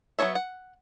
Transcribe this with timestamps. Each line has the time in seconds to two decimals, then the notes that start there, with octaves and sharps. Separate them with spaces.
0.19 F#3 B3 C#4 C#5 E5
0.35 F#5